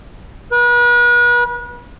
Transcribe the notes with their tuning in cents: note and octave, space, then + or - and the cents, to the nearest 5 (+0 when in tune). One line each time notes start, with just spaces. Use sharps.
B4 -40